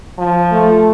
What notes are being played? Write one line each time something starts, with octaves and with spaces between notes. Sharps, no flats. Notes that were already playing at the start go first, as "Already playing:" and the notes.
F3
A3